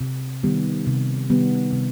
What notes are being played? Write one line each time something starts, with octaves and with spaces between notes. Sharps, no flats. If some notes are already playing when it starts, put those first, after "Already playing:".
C3
D#3 G3 B3
C3
D#3 G3 B3
C3